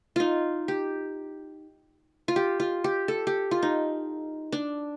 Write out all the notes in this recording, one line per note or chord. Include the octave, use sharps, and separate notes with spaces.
D#4 F4
G4
F4
G4
F4
G4
A4
G4
F4
D#4
D4